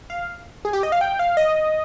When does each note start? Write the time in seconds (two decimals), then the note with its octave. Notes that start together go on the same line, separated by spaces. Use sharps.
0.10 F5
0.65 G#4
0.73 G4
0.83 D#5
0.92 F5
1.01 G5
1.19 F5
1.37 D#5